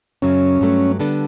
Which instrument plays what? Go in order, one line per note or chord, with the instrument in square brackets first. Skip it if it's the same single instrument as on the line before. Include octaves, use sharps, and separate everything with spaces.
[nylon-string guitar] F#2 C#3 F#3 [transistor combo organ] C#4
[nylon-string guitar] G2 F#3 A3
D3 G3 B3 D4 A4